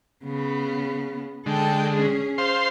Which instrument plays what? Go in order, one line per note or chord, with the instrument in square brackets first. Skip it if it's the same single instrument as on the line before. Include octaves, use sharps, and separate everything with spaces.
[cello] C#3 B3
[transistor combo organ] D3 G#3 [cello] A4 G5
[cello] C#4 G#4
[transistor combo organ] C5 F5 C6